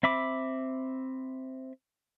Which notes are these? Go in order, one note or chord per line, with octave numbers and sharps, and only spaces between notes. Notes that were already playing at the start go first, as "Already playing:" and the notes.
C4 E5 B5 D6